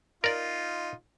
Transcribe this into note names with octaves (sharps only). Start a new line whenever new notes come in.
D#4 F4 A#4 D5